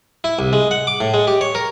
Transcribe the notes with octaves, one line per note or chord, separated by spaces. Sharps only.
E4
C2
G#3
F#5
D6
A2
G#3
G4
C#5
A#4